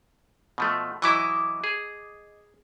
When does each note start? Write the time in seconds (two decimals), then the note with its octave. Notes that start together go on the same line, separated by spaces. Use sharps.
0.58 B2 F3 A3
1.02 E3 F#3 E4 D#5 D6
1.64 G#4